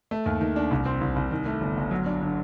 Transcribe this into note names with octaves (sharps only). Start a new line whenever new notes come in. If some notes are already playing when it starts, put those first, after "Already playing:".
A3
D#2
D#3
D4
C2
C4
C2
C2
D#3
A3
G1
G1
F#3
D4
D3